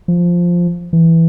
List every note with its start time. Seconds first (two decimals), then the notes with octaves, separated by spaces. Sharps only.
0.08 F3
0.93 E3